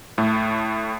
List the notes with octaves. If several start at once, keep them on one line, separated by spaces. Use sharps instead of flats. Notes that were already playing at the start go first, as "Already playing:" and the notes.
A2 A3